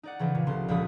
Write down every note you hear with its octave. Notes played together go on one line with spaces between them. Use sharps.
D#4 D5 F#5
C#3 E3 F3 D#4
A#2
C2 D3 C6
C#2 A#2 F3 G3 B5 D#6